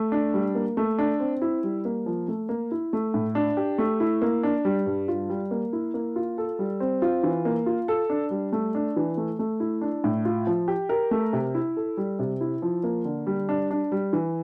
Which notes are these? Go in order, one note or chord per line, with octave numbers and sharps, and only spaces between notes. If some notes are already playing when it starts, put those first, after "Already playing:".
Already playing: A3
D4
G3
A#3
A3
D4
C4
E4
G3
A#3
F3
A3
A#3
E4
A3
A2
D4
G4
A3
E4
A#3
D4
G3
G2
F4
G3
A#3
E4
A#3
F4
A4
G3
C4
F4
E3
A#3
F4
A4
D4
G3
A3
D4
E3
A3
A3
E4
D4
A2
F4
F3
G4
A#4
A3
C3
E4
A4
G3
C3
E4
F3
A#3
D3
G3
D4
D4
G3
E3